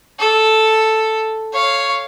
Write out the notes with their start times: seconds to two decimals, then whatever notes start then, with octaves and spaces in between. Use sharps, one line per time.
0.19 A4
1.53 C#5 F5